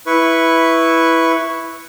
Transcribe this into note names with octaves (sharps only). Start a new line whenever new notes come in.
E4 B4 C#6